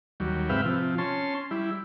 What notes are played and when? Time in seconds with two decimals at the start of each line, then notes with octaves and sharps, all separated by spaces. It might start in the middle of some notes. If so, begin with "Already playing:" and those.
0.20 D#2 F#3 G3
0.49 G#2 C3 B4 E5 F5 G5
0.65 C3 F3
0.98 C#4 A5 C6
1.51 G3 E4